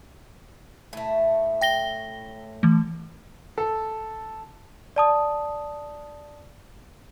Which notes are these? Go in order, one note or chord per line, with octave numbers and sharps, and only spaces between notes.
A2 A3
G5 A#6 G7
E3 A3
A4
D5 A5 D#6